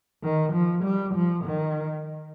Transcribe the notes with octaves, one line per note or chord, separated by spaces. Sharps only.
D#3
F3
G3
F3
D#3